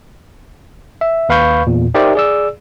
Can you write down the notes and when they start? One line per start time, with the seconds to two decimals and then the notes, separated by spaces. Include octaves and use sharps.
1.01 E5
1.29 D#2 B4 F5 B5 C#6 G6
1.67 E2 A#2
1.94 D#4 G4 A#4 C5 D5 E5
2.15 G#4 D5 E6